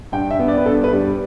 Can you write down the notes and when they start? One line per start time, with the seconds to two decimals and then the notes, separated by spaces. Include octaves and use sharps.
0.12 G2 G5
0.31 E5
0.39 B3
0.48 D5
0.58 B4
0.66 G2 A4
0.84 B4
0.93 G3
1.01 D5